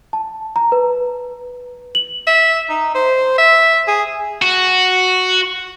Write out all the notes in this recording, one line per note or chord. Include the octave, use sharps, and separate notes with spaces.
A5
A#5
B4
F#7
E5
D#4
C5
E5
G#4
F#4